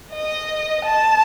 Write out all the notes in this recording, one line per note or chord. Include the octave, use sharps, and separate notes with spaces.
D#5
A5